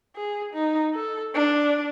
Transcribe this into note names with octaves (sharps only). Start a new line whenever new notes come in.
G#4
D#4
A4
D4